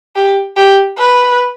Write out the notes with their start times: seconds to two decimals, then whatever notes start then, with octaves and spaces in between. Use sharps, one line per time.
0.16 G4
0.57 G4
0.98 B4